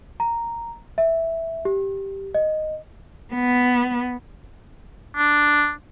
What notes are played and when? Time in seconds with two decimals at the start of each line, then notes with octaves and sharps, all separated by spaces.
0.20 A#5
0.98 E5
1.65 G4
2.35 D#5
3.33 B3
5.16 D4